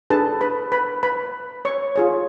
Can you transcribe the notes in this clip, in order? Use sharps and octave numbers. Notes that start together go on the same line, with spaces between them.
D4 G#4 A4 B4 A5
B4 B5
B4 B5
B4 B5
C#5 C#6
F4 G#4 C#5